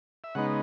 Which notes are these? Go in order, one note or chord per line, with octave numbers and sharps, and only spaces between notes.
E5
C#3 G#3 B3 D#4 F#5